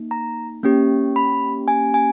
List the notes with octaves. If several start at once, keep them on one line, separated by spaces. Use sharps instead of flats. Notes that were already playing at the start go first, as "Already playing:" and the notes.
Already playing: A#3 D#4
A#5
A#3 C#4 G4
B5
G#5
G#5